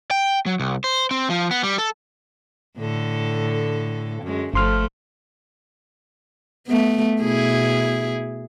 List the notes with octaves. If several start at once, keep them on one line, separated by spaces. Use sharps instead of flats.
G5
F#3
C2
C5
C4
F3
B3
G3
A4
A2 D3 A4
F#2 G#3
G1 F3 A3 C6 F6
A3 B3
B2 E4 G#4